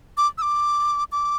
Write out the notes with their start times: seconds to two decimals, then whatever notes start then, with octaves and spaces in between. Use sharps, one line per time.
0.17 D6
0.38 E6
0.42 D6
1.12 D6